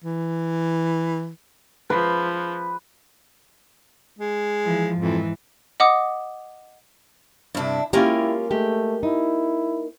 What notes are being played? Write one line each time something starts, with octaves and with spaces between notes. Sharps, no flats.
E3
F3 B4
G#3
E3 F3
F2 G#2 E3
D#5 F#5 D6 D#6
G2 C3 D4 E4
G#3 A#3 C#4 E4 F4 G4 A#4 G#5
G#3 A3 G4
D#4 E4